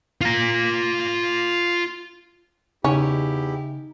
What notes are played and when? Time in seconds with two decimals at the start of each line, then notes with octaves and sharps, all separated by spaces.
0.21 F4 A#5
2.84 E2 C#3 C#4 D#4 E4 G4